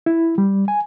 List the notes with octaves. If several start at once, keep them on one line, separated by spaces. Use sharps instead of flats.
E4
G3
G#5